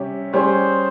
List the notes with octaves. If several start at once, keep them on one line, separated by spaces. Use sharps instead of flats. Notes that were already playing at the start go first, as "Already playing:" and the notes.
Already playing: C3 G3 C#4 G4
G3 C#4 G#4 C5